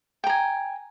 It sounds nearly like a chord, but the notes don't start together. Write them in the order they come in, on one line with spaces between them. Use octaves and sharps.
G5 A#5 G#5